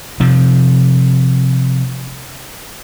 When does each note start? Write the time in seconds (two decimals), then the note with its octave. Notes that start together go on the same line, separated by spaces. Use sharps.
0.20 C3 F3